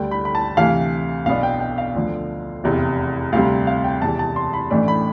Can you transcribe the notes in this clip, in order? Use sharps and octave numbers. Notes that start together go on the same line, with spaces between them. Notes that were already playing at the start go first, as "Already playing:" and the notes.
Already playing: D2 D3 G3 G5
B5
B5
A5
D2 C3 E3 F5
B1 B2 B3 D4 F5
G5
G5
F5
D2 D3 F3
F1 E2 C3
D2 C3 G3 F5
F5
G5
E1 E2 C3 E3 A5
A5
C6
B5
A1 A2 E3 A3 D4
B5